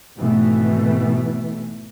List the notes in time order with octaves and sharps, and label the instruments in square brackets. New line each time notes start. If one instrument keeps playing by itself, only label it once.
[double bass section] G#1 B2 E3 A3